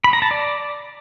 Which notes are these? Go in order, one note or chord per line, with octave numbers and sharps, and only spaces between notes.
B5
A#5
A5
D5